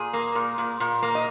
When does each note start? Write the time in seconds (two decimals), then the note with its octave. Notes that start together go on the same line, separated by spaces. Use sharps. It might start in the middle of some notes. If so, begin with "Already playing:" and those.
Already playing: A#2 G#4
0.13 A#3
0.35 A#2
0.58 A#2
0.80 A#2
1.02 A#3
1.15 D#5